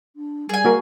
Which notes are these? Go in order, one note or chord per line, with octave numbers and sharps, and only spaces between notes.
D4
G3 G#4 G#5
A#3 F#4 A#4